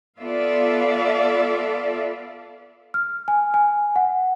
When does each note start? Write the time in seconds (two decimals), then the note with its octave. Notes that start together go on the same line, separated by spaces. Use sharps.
0.20 B3 F4 A4 D5 E5 F5
2.94 F6
3.28 G#5
3.54 G#5
3.96 F#5